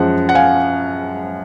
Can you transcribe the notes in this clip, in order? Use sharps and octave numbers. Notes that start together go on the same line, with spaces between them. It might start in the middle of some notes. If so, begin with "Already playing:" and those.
Already playing: F#2 F3 G#3 F#5
F#5
F5 G#5